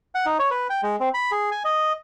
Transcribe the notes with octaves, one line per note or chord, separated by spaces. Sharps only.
F#5
D#4
C#5
B4
G5
G#3
C4
B5
G#4
G#5
D#5